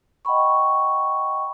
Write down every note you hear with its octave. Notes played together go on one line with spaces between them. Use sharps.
D#5 F#5 G5 B5 C#6